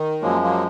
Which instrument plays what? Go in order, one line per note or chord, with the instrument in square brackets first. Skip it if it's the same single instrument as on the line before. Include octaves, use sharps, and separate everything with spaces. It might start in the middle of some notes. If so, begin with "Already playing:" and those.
Already playing: [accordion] D#3
[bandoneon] F#2 F3 G#3 [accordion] F#3 A#3
[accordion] F#3 A#3